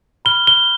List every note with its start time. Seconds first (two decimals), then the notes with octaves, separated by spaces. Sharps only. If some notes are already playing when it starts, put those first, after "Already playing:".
0.25 B5 F6 G7
0.47 G7